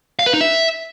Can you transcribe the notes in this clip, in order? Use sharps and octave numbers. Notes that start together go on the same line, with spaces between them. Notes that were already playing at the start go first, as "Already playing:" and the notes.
F5
B4
D#4
E5